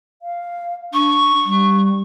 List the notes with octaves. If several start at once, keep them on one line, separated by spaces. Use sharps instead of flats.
F5
D4 C#6
G3